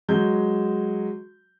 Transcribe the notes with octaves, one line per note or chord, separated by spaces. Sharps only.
F#3 G#3 G6